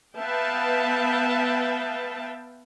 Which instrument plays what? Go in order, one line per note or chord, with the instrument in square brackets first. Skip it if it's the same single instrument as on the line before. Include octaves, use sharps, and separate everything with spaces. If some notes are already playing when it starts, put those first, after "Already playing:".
[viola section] B3 B4 E5 F5 G5 A5